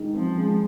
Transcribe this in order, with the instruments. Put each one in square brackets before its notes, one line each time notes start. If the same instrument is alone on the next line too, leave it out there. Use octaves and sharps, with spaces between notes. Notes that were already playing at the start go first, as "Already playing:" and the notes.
Already playing: [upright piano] D#3 G#3 D#4
[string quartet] F3 [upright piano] C4
[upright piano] G#3